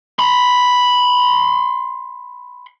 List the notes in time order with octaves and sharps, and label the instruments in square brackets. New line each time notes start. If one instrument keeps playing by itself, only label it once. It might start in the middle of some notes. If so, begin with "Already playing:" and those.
[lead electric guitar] B5 C6